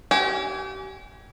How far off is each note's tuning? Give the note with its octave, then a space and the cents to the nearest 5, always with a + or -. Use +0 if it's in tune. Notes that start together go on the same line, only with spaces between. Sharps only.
G4 -35 G#5 +0